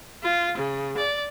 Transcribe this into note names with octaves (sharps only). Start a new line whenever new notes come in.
F4
C#3
D5